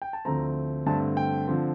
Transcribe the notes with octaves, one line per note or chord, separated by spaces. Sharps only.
G5
A5
D2 D3 F3 A3 C4 A#5
G2 D3 A3 C4 A5
G5
D3 F3 C4